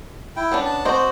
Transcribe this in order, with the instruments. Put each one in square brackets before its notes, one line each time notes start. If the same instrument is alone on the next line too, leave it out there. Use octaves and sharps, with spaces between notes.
[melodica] E4 G5
[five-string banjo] B3 C#4 D4
[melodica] A5
[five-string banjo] C4 D5 D#5 [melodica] F#4 C5